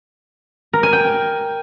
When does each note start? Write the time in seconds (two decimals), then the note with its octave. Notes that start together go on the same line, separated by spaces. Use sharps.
0.73 A#4
0.83 G#5
0.93 G5